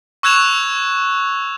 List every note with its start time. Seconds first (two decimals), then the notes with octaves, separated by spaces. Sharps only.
0.23 C#6 E6 F#6 G#6 E7 F7